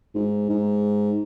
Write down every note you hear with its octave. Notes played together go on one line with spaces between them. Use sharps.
G#2
G#2